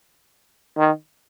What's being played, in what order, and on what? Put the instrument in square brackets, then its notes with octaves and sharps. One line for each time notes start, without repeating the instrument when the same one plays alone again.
[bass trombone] D#3